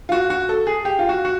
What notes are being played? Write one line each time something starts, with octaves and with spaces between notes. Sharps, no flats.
F4
F#4
F#4
A4
G#4
G4
F4
F#4
F#4